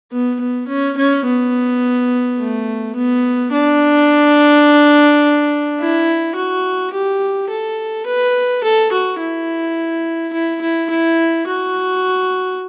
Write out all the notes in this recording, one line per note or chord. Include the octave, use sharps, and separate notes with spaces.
B3
B3
C#4
C#4
B3
A3
B3
D4
E4
F#4
G4
A4
B4
A4
F#4
E4
E4
E4
E4
F#4